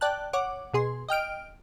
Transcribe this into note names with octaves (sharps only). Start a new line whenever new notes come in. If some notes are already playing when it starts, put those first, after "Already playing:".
D5 G5 A5 F#6
C#5 F#5 D6
B2 G#4 C6
D#5 G5 F6 D7